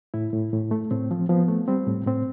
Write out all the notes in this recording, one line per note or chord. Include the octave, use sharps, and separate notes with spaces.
A2 E4
A2
A2
A3
A2 C4
F3
F3 B3
A3
G3 C4
A2
A2 C4